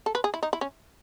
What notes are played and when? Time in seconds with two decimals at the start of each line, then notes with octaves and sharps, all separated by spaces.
0.06 A4
0.15 B4
0.24 G#4
0.34 E4
0.43 D#4
0.53 E4
0.61 C#4